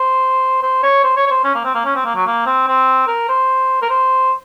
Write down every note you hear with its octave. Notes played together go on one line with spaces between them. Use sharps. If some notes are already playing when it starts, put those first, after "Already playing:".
Already playing: C5
C5
C#5
C5
C#5
C#5
C5
C#4
A#3
C4
A#3
C#4
C4
A#3
F#3
A#3
C4
C4
A#4
C5
A#4
C5